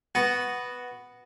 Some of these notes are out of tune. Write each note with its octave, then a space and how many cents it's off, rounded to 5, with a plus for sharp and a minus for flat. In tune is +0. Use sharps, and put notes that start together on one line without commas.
B3 +0 F#4 +0